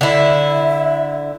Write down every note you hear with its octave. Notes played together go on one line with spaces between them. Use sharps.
D3 E4 E5